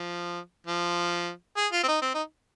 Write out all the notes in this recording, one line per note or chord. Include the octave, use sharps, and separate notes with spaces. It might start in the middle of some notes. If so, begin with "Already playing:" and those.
Already playing: F3
F3
G#4
F4
C4
D#4
C4
D#4